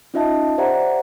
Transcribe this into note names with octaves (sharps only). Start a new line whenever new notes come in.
C#4 D#4 F4 D#5 E5 A5
G4 C5 D5 E5 F#5 A#5